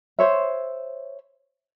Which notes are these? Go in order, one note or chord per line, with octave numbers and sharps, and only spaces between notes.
C5 C#5 E5